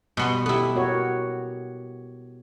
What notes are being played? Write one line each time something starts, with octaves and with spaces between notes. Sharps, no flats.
B2 G3 B3 C6
B3 E4 G4 A4
F#4 A#4 C#5